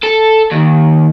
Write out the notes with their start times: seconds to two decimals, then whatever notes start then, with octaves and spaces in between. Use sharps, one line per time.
0.03 A4
0.51 D#2